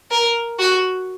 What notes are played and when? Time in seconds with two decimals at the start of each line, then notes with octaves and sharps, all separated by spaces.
0.11 A#4
0.59 F#4